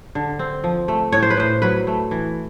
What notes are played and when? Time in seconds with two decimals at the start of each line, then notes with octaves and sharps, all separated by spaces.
0.15 D3
0.39 C4
0.64 F3
0.88 A3
1.12 A2 C#5
1.22 C5
1.30 B4
1.37 A2 C5
1.62 F#3 B4
1.87 A3
2.11 E3